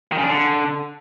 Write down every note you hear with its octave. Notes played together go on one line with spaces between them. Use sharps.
D#3
C#3
D4
D3